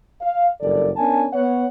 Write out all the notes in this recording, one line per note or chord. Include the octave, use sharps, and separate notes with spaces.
F5
F#1 G2 A4 A#4 D5
B3 C#4 D4 A#4 G#5 A5
B3 C#5 F#5